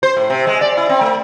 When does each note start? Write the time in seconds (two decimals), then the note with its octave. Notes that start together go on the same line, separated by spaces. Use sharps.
0.03 C5
0.17 A2
0.30 C3
0.47 G#3
0.61 D5
0.77 E4
0.89 C4
1.01 A3